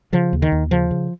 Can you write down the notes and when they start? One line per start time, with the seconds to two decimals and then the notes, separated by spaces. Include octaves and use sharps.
0.13 C#3 F3
0.33 D#2
0.42 D#3
0.52 D#2
0.71 C#3 F3
0.91 C#3